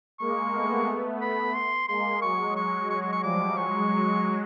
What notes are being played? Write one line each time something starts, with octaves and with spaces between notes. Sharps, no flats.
G#3 A#3 C#6
A3 B3
B5
C6
G#3 A#3 C6
F#3 G#3 C#6
C#6
C#6
C#6
C#6
F3 G3 D6
F#3 G#3 C#6
F#3 G#3